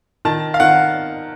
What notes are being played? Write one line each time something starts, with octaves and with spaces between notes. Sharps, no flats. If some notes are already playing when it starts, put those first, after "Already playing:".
D#3 A5
F5
D#3 F#5